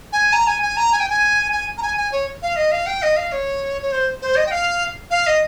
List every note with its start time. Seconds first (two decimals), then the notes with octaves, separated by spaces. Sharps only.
0.13 G#5
0.33 A#5
0.47 G#5
0.62 G#5
0.77 A#5
0.92 G#5
1.00 G5
1.10 G#5
1.52 G#5
1.78 A#5
1.83 G#5
1.97 G#5
2.12 C#5
2.42 F5
2.56 D#5
2.72 F5
2.86 G5
3.02 D#5
3.16 F5
3.32 C#5
3.82 C#5
3.92 C5
4.22 C5
4.36 D#5
4.46 G5
4.51 F5
5.11 F5
5.27 D#5